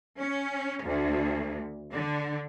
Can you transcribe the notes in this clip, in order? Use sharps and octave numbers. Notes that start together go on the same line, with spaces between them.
C#4
D2
D3